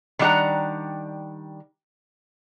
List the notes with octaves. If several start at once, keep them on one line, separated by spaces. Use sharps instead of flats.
D#3 G3 D4 F#4 F#5 A#5